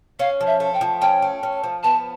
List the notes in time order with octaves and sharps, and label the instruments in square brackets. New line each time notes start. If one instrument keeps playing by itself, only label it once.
[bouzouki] C#4 [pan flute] F5
[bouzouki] F3
[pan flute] E5
[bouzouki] A3
[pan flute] G5
[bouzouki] F3
[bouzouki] C#4 [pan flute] G5
[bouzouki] A3
C#4
F3
[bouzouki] B3 [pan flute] A5